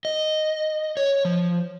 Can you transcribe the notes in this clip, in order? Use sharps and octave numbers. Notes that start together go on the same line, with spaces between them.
D#5
C#5
F3